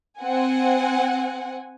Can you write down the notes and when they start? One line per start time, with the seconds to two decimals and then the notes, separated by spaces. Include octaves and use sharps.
0.19 C4 F#5 G#5